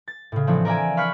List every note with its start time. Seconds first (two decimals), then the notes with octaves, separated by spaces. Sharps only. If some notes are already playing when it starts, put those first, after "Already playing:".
0.08 A6
0.32 A2 C#3
0.47 E3 F3 A3 C4 D4
0.65 A#4 D5 E5 G#5
0.97 F5 B5 C#6 F6 F#6 B6